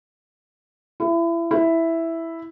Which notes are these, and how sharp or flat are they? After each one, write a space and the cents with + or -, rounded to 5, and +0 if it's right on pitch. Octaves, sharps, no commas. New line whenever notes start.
E4 +30
E4 +0